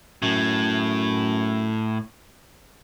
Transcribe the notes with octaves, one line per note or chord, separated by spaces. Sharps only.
F#2 A2